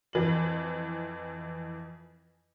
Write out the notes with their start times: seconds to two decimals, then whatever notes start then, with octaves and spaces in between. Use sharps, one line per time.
0.13 F2 E3 F#7